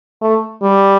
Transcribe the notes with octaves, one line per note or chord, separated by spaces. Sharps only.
A3
G3